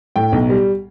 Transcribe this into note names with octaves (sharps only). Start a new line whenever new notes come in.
A2 G5
B1
G3